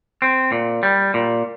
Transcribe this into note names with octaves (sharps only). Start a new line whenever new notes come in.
C4
A#2
G3
A#2